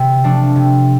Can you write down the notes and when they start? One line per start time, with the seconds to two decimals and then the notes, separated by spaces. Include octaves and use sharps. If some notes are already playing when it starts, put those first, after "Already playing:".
Already playing: C3
0.24 F3 A3 D4
0.56 C3